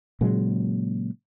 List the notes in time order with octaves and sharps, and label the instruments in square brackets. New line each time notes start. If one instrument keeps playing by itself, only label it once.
[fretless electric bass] A#2 C#3 F#3 G#3